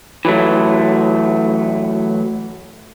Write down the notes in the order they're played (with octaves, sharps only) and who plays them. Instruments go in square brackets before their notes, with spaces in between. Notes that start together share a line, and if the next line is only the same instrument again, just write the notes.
[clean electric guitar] E3 F#3 A3